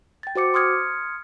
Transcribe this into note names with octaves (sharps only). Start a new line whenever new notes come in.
G5 A6
F#4 C5 D6 C#7
C6 D#6 F6 G#6 C#7